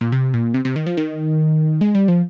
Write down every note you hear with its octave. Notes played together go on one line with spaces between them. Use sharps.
A#2
C3
A#2
C3
C3
D#3
F3
D#3
G#3
G3
F3